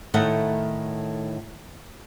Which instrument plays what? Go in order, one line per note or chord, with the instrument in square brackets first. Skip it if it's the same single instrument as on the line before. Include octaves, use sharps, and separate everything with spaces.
[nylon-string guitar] A2 D#3 A3 F#5